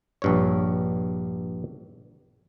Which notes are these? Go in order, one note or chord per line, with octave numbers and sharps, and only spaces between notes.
A#1 G2 C#5